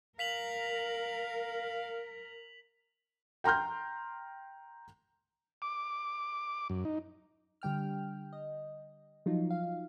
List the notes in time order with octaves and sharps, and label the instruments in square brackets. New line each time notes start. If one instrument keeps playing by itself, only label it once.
[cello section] A#4 [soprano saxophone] F5 [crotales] B6 F7 F#7
[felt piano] G5 A#5 C6 F6 G6
[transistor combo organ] D6
F#2
D#4
[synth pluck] D3 G3 G5 F6
D#5
F3 F#3 D#4 F4
F5